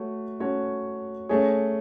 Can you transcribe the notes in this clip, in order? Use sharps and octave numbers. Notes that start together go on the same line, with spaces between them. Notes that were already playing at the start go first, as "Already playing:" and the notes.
Already playing: A3 F#4 C#5
A3 C#4 F#4 C#5
A3 C#4 G#4 C#5